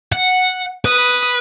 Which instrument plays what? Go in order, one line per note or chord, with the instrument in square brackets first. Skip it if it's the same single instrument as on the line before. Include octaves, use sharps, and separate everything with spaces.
[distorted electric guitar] F#5
[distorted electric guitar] B4 [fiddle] D#6